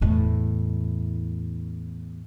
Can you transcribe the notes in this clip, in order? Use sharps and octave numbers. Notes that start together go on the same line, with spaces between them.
E2 A2